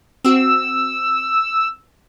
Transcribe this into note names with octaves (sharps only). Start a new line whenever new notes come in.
C4 F#4 E6